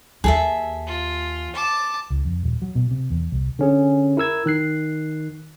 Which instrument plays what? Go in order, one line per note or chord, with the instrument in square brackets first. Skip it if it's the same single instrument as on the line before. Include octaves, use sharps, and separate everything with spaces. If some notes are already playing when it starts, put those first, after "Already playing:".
[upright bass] D#2 [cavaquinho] G#4 A4 E5
[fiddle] F4
A5 D6
[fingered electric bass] C#2
F2
D#1
F#3
B2
C3
E2
C2
[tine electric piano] D3 C#4 G#4
E4 A#4 E6 G#6
D#3 F#6 C7